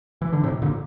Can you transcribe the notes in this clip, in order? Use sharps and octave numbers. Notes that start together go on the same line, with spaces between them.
E3
D3
A2 C3
A#2 D3